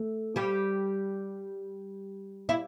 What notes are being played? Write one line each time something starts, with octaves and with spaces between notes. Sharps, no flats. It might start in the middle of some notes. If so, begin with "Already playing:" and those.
Already playing: A3
G3 G4
E4